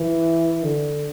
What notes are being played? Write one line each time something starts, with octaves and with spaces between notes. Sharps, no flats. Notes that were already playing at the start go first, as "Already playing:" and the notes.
Already playing: E3
D3